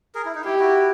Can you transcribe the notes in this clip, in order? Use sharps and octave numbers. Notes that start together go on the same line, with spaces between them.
G#4 A#4
E4
D#4
E4 G4
E4 F#4